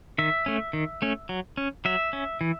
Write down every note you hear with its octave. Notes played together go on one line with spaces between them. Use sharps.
D#3 E5
A3 C#4
D#3
A3 C#4
F#3
C#4
F#3 E5
C#4
E3